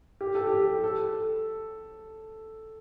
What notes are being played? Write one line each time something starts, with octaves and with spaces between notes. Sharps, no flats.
G4
A4
G4
A4